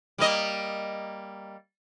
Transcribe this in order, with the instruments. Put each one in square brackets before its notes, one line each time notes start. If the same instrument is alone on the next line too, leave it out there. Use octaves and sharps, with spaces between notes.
[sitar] G3 A#3 D#5